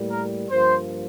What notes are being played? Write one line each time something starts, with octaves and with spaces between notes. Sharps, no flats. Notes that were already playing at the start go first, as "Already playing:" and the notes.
Already playing: A2 G3 A#3
A#4
G2 F3 A#3 C5